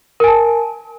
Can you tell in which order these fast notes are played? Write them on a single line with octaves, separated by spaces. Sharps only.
A#4 G#5 A5